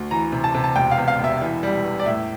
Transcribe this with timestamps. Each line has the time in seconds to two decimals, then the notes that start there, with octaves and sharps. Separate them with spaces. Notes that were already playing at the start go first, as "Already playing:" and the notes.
Already playing: D2
0.11 E3 A#5
0.32 C3
0.44 A5
0.54 C3
0.64 A5
0.76 E1 G5
0.91 F5
0.98 E2
1.08 F5
1.19 E1 E5
1.41 E3
1.63 G3
1.84 E2
1.99 D5
2.06 A2 E5